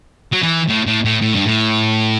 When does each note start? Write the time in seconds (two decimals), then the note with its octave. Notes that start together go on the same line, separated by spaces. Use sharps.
0.33 F#3
0.43 E3
0.69 A2
0.87 A2
1.05 A2
1.22 A2
1.34 G2
1.45 A2